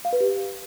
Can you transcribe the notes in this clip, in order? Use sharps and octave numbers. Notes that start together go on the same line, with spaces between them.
F5
B4
G4